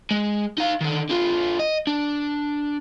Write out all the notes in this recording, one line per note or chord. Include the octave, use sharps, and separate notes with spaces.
G#3
D#4 F5
D3 D#3
D3 F4
D#5
D4